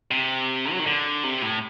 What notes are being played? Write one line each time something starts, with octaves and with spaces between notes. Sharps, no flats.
C3
F#3
D#3
D3
C3
A2